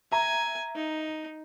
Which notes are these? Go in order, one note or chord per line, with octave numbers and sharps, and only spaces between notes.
E5 G#5 A#5
D#4